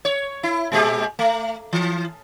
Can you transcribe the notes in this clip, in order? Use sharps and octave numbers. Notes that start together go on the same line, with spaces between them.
C#5
E4
A#2 G#3 G4
A3
E3